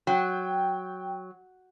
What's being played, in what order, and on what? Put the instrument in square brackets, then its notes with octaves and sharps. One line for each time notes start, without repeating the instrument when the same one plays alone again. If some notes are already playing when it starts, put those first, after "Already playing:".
[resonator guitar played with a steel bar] F#3 [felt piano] G5